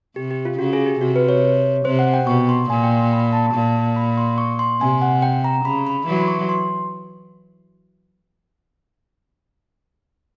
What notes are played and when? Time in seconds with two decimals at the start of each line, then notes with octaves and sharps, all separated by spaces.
0.16 C3 G4
0.31 G4
0.45 F4
0.59 C#3 F#4
0.73 G#4
0.86 G4
1.00 C3 F#4
1.16 B4
1.29 C#5
1.85 C3 C5
1.99 F#5
2.14 G5
2.27 B2 C#6
2.49 C6
2.70 A#2 G#5
2.83 G5
2.97 C6
3.12 B5
3.33 A5
3.54 A#2
3.96 B5
4.17 C6
4.38 C#6
4.59 C6
4.81 C3 G#5
5.02 F#5
5.22 G5
5.44 A#5
5.65 C#3 B5
5.87 B5
6.07 E3 F#3
6.20 C6
6.28 C#6
6.49 C6